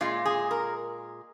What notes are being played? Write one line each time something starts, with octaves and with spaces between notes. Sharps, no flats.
A#2 G#3 F4
G#4
A#4